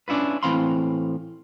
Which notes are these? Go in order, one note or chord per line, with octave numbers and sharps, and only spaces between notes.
C#4 D4 E4 F4 B4
A2 E3 C4 F5 B5 C6